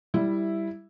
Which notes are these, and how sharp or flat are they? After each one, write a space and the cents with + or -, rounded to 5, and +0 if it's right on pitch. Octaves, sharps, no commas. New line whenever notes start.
G3 +0 E4 +0 E5 +0